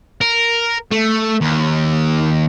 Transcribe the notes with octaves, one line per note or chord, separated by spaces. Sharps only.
A#4
A3
D#2